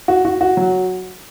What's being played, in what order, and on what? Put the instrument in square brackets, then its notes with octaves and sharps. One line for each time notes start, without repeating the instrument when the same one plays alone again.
[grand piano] F#4
F#4
F#4
F#3